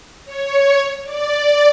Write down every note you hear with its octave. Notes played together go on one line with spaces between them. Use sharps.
C#5
D5